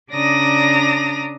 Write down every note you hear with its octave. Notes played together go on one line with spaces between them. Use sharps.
C#3 D4 D5 A#5 D#6 A#6